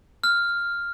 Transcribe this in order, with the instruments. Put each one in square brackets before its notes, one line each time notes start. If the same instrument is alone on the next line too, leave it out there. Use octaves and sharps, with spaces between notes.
[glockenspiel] F6